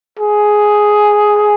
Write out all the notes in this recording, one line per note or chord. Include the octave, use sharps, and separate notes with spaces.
G#4